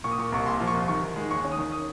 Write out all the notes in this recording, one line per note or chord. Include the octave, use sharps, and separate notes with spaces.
A#2 C#6
D#6
A#2 C#6
C2 C#6
A#2 C6
F3
C#6
C2
D#3 C#6
D#3
G#3
D#2 C#6
C#4
D#6
D#3
D#6